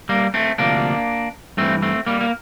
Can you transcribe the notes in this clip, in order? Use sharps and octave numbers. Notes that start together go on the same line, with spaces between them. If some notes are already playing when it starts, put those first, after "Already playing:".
G3 A#3
A3 C4
D2 C3 F3 A#3 D4
G2 E3 A3 C4
A3 C4
G3 A#3
A#3